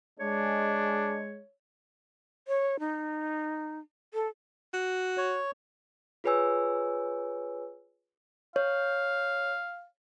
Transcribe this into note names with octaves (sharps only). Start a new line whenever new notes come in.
G#3 D4 C#5
C#5
D#4
A4
F#4
C#5
F4 G#4 B4 C#5 G#5 E6
C#5 F5